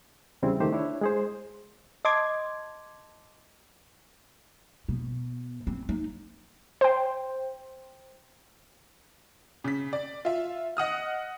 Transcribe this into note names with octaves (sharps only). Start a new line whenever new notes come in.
E2 C#3 G3 C4 E4
C#2 D#3 A3 G4 C5
D4 E4 C#5
G#3 G#4 C5
D#5 A5 C6 D6 G#6
B2
C4
D#4
C5 G5
C#3 B6
D5
F4 E5
D#5 F#5 D#6 F6